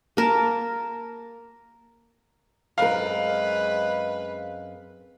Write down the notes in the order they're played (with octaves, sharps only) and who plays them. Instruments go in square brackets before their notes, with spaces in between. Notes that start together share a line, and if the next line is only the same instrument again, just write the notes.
[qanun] A#3 A#4 A5
[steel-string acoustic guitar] F#2 C4 A#4 [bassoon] G#3 [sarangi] B4 [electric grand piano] F5